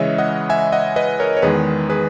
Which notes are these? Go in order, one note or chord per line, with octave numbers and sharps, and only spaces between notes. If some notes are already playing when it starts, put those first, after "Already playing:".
Already playing: C#3 E3 G#3 B4 C#5 D#5 E5
D#5 F#5
E5 G#5
D#5 F#5
B4 D#5
A#4 C#5
C#5
E2 D#3 G#3 G#4 B4
G#4 B4